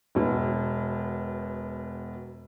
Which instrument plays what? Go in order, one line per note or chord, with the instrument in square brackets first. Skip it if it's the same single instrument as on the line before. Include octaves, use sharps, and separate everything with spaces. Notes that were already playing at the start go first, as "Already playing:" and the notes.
[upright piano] E1 B2